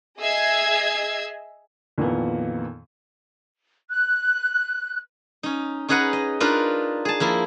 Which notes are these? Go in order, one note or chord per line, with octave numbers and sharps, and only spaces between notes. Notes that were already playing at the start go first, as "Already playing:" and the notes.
G#4 D#5 E5 E6 G#6 C7
F2 A#2 D#3 E3 A#3 B3
F#6
C#4 D#4
C#4 D#4 G#4 B4 F#5 A#5
D#5
D4 D#4 F4 A#4 B4
G#4 A5
F3 A#3 E4